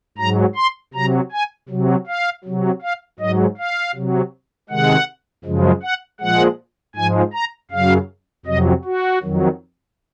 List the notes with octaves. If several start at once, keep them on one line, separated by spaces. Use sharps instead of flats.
G#2 F#3 A#5
C6
C3 F#3 A#5
G#5
C3 F#3
F5
C3 F#3
F5
G#2 F#3 D#5
F5
C3 F#3
C3 D#3 G#3 F#5
F#2 C#3 F3 G#3
F#5
A#2 F3 G#3 F#5
G#2 F3 G#3 G#5
A#5
F#2 C#3 F#3 F5
F2 C3 F#3 D#5
F#4
F2 D#3 F#3